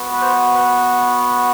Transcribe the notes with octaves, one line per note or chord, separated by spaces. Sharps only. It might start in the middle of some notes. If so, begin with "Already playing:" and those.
Already playing: B3 F#4
B4
C5
B4